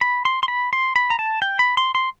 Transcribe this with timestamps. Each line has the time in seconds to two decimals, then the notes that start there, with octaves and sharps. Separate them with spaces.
0.01 B5
0.25 C6
0.43 C6
0.48 B5
0.73 C6
0.96 B5
1.10 A#5
1.19 A5
1.42 G5
1.59 B5
1.77 C6
1.95 C6